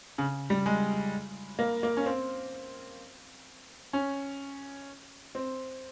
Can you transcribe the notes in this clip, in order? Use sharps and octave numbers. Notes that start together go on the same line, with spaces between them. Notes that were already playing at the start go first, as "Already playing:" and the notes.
C#3
G3
G#3
A#3
A#3
C#4
C4
C#4
C4